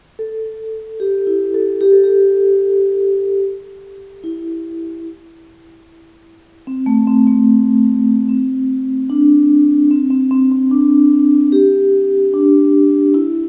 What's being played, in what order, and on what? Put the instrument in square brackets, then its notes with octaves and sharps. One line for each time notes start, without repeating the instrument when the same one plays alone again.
[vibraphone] A4
G4
E4
A4
G4
A4
G4
E4
C4
A3
C4
A3
C4
D4
C4
C4
C4
C4
D4
G4
D4
E4